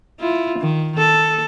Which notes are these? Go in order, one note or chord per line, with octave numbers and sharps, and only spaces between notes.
E4 F4
D#3
A4